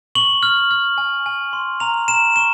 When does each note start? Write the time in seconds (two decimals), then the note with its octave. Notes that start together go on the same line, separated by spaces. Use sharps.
0.15 C#6 F#7
0.43 F6
0.71 F6
0.98 G#5
1.26 G#5
1.53 C6
1.80 A#5 F7
2.08 A#5 E7
2.36 C#6 E7